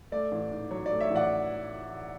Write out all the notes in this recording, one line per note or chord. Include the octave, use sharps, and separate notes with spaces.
A3 D5
A1
G#2
F#3 C#5
D5
A3
C#5 E5
A1 D5 F#5